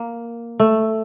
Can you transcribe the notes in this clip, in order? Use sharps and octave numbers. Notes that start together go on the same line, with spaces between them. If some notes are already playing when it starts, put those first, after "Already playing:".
Already playing: A#3
A3